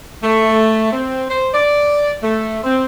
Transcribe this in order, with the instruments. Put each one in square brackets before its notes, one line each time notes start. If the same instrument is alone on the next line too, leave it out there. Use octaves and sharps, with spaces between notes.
[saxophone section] A3
C4
C5
D5
A3
C4